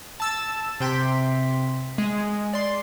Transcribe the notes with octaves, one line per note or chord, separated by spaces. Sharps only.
A5 E6 A6
C3 G5 C6 B6
G#3
D5 C6